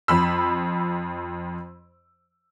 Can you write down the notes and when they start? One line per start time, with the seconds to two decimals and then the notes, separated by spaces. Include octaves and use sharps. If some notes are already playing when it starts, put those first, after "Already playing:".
0.08 F2 B5 E6